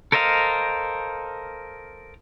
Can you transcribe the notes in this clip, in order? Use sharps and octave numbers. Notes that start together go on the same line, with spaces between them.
A4 A#4 C5 D#5 F5